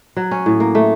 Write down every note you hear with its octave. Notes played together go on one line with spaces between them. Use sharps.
F#3
C#4
A2
A#3
A3